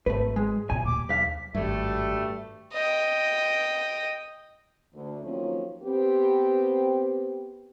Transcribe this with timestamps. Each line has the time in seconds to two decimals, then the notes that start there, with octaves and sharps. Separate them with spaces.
0.06 G#1 A3 B4
0.36 G#3
0.70 A#2 C4 G#5
0.85 D#2 D6
1.09 B1 F5 B6
1.55 G#1 G2 B2 G3 A3
2.73 D#5 G5
4.94 D2
5.24 D#3 F3 F#3 A#3 C4 C#4
5.83 B3 C4 G4